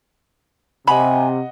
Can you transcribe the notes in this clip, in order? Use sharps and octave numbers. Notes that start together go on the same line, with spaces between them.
C3 D#5 F#5 G#5 B5